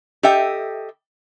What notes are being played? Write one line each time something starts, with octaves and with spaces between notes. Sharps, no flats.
G4 A4 D#5 E5 G5